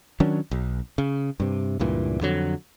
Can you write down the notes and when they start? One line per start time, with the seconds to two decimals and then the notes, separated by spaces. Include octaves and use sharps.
0.20 D#3 F#3 C#4 D4
0.51 B1
0.98 C#3
1.40 G2 C3
1.79 C#2 G2 A#2 E3
2.21 F2 D3 F#3